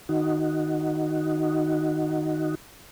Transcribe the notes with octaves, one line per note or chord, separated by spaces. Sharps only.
D#3 D#4 F#4